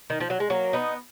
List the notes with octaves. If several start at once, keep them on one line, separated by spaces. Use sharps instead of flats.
D#3
F3
F#3
G#3
F#3 A#3
B3 D#4